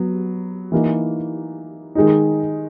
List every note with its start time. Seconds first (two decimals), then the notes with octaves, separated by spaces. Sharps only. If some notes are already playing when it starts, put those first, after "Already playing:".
Already playing: F#3 B3
0.72 E3 A#3 D#4
1.95 D#3 G#3 D#4